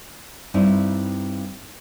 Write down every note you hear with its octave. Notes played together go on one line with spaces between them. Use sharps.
G2 C4 D#4 E4